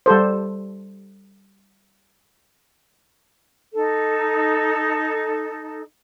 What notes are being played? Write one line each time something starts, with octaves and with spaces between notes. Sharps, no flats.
G3 G4 A4 C5
D#4 A4